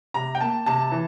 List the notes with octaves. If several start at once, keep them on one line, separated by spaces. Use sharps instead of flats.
C3 A#5
G5
A#3 A5
C3 A5
E3